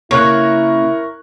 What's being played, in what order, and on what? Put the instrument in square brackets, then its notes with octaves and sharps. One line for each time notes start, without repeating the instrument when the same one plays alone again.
[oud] C#3 A#3 [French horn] E4 [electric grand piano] A#4 C#6 F#6 [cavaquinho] C#5